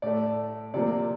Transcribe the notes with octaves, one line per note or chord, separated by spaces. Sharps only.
A2 A3 D5
C3 F3 A#3 D5